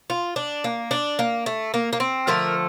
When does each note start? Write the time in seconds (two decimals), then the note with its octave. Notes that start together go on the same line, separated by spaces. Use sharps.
0.10 F4
0.36 D4
0.64 A#3
0.91 D4
1.19 A#3
1.46 A3
1.74 A#3
1.93 A#3
2.00 C4
2.27 D3 F3 A3 A#4